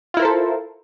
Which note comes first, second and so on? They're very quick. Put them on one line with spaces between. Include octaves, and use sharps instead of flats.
F4 E4 A#4 C5 A4